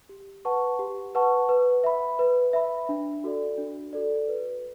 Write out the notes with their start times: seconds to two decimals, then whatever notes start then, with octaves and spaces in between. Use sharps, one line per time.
0.09 G4
0.45 B4 F#5 A5 C#6
0.79 G4
1.15 B4 F#5 A5 C#6
1.49 B4
1.84 E5 B5
2.19 B4
2.53 E5 B5
2.89 D4
3.24 F#4 A4 D5
3.58 D4
3.93 F#4 A4 D5
4.28 B4